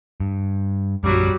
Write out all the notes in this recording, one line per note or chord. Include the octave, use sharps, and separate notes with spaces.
G2
A#1 F#2 F#3 G3